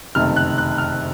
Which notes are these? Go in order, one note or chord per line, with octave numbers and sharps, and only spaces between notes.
F#1 F2 C3 D#3 A3 F6
F#6
F#6
F6